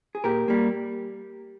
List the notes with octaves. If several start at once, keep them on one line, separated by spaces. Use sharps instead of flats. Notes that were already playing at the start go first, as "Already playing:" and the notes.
G#4
A#2 G4 A#4
G3 A#3